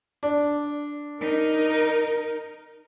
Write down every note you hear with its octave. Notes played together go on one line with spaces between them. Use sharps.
D4
D#4 A#4